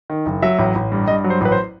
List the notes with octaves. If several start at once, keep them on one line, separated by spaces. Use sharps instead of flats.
D#3
F#1
F#3 E5
A1
A1
G2
G2 D#5
F#3
C5
A1 B4
C5